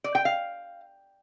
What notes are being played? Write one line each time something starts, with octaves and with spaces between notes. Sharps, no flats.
D5
G5
F5